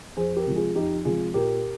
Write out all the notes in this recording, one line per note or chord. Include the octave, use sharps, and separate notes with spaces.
F2 G#4 C5
G4 A#4
C3 F3 G#3
F4 G#4
F2 D#4 G4
C3 F3 G#3 F4 G#4
A#2 G4 A#4